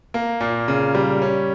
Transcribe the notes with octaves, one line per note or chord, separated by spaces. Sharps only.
A#3
A#2
C#3
G3
C#4